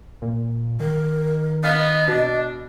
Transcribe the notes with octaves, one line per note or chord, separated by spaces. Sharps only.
A#2
D#3 A#4
B3 D#5 F5
B2 D4